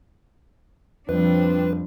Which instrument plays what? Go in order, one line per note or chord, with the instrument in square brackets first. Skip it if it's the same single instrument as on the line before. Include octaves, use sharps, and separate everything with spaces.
[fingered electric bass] F2 [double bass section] F3 G3 C4 [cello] D4 [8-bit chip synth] B4